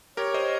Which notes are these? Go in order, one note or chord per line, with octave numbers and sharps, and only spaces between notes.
G4 A#4 C#5
C5 D#5